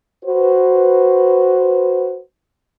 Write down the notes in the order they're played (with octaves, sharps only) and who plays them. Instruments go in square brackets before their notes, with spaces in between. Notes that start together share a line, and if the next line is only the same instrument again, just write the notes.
[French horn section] F#4 B4 C5